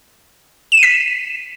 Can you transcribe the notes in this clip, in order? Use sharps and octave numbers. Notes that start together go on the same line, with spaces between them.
E7
D#7
B6